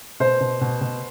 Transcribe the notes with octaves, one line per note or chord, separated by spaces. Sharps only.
B2 C5
B2
B2
B2